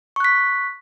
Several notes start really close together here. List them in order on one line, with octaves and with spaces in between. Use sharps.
C#6 F#6 B6